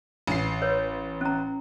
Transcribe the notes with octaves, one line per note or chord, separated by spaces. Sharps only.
A1 C7
B4 C#5
C#4 A#5